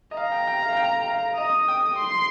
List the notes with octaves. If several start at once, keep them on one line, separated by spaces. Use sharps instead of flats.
D#5
F5 A#5
G5
G5
F5
F5
G5
F5
D#5 D#6
G5
C6